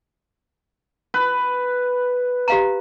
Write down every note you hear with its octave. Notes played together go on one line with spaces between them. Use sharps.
B4
G4 F5 A#5